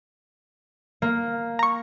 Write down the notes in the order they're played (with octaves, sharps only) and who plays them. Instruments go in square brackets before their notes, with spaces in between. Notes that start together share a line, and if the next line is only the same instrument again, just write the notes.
[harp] A#3
[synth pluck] A#5 C#6